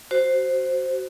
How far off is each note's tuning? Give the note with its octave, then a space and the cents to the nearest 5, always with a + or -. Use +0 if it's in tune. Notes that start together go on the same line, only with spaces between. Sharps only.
F#4 +15 C5 +0